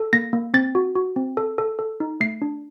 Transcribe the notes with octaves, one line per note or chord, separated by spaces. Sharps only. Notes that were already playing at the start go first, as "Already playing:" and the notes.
Already playing: A4
A#3 A#6
A#3
C4 A6
F#4
F#4
C4
A4
A4
A4
D#4
A3 C7
D4